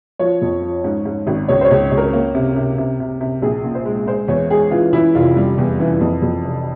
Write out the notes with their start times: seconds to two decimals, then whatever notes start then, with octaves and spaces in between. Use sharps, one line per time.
0.19 F3 C#5
0.42 F2
0.62 F3
0.84 G#2
1.05 G#2
1.27 G#1
1.48 C#2 C#5
1.61 C5
1.65 C#5
1.71 C#2
1.91 C#2
1.97 A#4
2.13 A#3
2.35 C3
2.56 C3
2.78 C3
3.00 C3
3.21 C3
3.42 A#1 G#4
3.64 A#2
3.75 C5
3.85 G#3
4.07 G#3 C5
4.28 E2 C#5
4.50 G#3 G#4
4.71 E3 F4
4.93 E3 E4
5.15 F1 F4
5.36 G3
5.58 E2
5.80 E3
6.01 F2
6.22 F2
6.44 F1